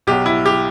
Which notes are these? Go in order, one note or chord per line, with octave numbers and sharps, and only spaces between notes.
B1 B2 F#3 G4
E4
G4